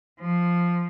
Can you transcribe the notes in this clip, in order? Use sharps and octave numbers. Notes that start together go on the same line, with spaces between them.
F3